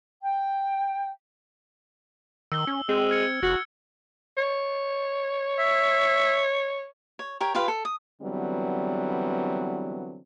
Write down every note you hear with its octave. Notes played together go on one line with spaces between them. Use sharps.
G5
D#3 E6 G7
C#4
G#3 C4
F6 G#6 C#7
F1 F#4
C#5
E5
C#5
G4 A#4 C#5
F4 G4 B4 F5
A4
D#6
D3 E3 F#3 G3 B3 C4